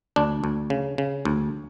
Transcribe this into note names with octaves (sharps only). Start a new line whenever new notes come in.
D2 D4
D2
C#3
C#3
D2